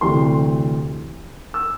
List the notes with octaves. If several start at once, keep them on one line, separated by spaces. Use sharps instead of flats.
D2 C3 E3 C6
E6